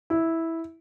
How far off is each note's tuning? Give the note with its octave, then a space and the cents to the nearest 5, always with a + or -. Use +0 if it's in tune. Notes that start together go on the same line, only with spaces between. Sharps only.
E4 -10